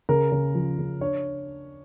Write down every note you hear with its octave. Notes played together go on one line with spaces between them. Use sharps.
C#3 A#4
C#3
F3
C#3
D4 C#5